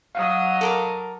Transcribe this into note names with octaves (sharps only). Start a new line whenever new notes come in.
F#3 D#5 F5 F#5 D#6
A4 A#4 D6